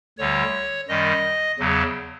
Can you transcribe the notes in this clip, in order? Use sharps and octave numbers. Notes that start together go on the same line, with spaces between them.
D2 D3 G3 C#5
F#2 D#3 G3 D#5
E2 C#3 F#3